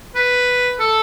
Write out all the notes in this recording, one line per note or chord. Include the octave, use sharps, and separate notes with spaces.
B4
A4